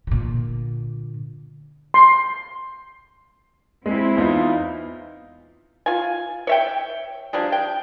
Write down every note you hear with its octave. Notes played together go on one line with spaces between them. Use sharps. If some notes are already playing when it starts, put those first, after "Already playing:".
A#2 D3
C6
G#3 C4 E4
E2 D#4 F4
F4 G#5
C#5 E5 G5
F3 G3 D4 G#4
G5